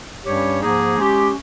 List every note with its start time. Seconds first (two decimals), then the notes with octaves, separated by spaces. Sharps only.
0.24 G2 G3 C#4 G4 C#5
0.61 G#2 F3 A#3 D#4 G#4
0.98 G#3 C#4 G4